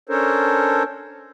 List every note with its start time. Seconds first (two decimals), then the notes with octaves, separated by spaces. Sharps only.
0.09 C#4 D4 A4 A#4 C5 C#5